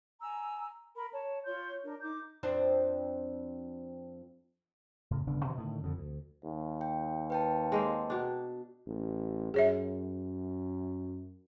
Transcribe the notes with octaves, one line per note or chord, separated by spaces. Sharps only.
G#5 A#5 E6
A#4 B5
C#5 A5
F4 C#5 C6 G6
D4 A#4
D#4 D6 G6
F2 C4 D4
A2 C#3
G1 C#3 B3 D4
B2 D3 E3 F3
A2 D3 D#3
F2 D3
D2
D#2
G5
B4 G5 A5
G#3 A#3 C4
B2 D4
A1
F#2 G#4 C#5 E5